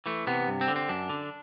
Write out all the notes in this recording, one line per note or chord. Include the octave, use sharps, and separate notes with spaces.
E3 A3
C3 B3
G2
C4
D3
C4
F#2 D4
D3